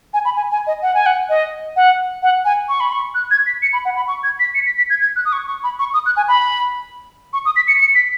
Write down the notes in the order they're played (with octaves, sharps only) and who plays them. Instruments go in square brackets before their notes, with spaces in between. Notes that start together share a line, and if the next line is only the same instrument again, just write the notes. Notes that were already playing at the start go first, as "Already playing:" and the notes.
[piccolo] G#5
B5
G#5
G#5
D#5
F#5
G#5
F#5
D#5
F#5
F#5
G#5
C#6
B5
C#6
F#6
G#6
B6
C#7
B5
F#5
B5
C#6
G#6
B6
C#7
B6
B6
G#6
G#6
F#6
D#6
C#6
C#6
B5
C#6
D#6
F#6
G#5
B5
C#6
D#6
B6
C#7
C#7
B6